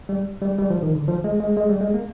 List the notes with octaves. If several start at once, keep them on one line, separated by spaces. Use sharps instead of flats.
G3
G3
G3
F3
D#3
D3
F3
G#3
G#3
G#3
G3
G#3
A#3